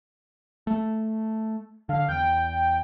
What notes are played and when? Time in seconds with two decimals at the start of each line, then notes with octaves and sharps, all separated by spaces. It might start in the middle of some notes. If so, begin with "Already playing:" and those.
0.67 A3
1.89 D3 F5
2.09 E2 G5